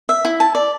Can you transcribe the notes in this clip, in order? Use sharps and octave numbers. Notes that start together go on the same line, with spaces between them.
E5
E4
A5
D5